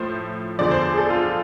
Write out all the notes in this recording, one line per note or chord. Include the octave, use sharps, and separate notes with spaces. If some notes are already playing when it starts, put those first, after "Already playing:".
Already playing: A2 F3 C5
E2 D3 F3 D5
C5
G#4
A4
F4